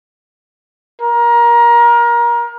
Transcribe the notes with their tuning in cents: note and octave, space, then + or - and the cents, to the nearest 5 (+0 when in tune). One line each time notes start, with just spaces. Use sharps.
A#4 +25